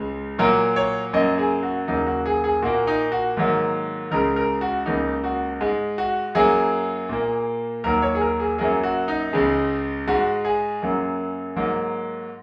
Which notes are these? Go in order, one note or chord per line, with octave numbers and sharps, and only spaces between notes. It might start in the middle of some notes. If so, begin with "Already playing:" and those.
Already playing: C#2 C#3 G#3
A#2 F#3 A#3 A#4
C#5
F#2 F#3 A#3 D#5
G#4
F#4
D#2 C#3 F#3 A#3 D#4
F#4
G#4
G#4
A#2 A#3 F#4
D#4
F#4
G#2 D#3 F#3 A#3
C#2 C#3 G#3 A#4
A#4
F#4
C#2 C#3 A#3 D#4
F#4
G#2 G#3
F#4
F#2 F#3 A#3 G#4
A#2 A#3
D#2 D#3 F#3 A#3 A#4
C#5
G#4
A#4
G#4
F#2 F#3 A#3 G#4
F#4
D#4
C#2 C#3 G#3
G#2 G#3 F#4
G#4
F#2 F#3 A#3
G#2 F#3 A#3